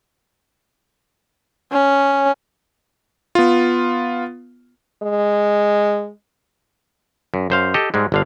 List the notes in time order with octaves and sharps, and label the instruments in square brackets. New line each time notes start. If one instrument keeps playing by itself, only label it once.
[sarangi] C#4
[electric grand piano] B3 F4
[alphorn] G#3
[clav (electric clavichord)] F#2
F#2 C5 F5
G4 A4 D#5
G#2 G3 G#3
G1 D3 F5